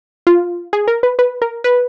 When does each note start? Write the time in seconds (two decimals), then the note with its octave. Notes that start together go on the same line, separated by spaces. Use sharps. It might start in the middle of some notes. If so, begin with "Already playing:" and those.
0.27 F4
0.73 G#4
0.88 A#4
1.03 B4
1.19 B4
1.42 A#4
1.64 B4